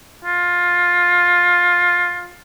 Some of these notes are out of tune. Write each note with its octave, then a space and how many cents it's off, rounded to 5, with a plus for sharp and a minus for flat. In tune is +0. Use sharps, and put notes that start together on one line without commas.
F4 +15